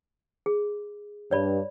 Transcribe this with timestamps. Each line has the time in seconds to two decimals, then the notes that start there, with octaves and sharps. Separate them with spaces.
0.46 G#4
1.31 G2 C#5 D5 B5